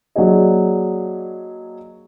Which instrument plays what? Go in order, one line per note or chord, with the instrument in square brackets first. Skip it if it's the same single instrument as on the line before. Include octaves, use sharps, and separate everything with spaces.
[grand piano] F#3 A#3 D4 G#4 D#5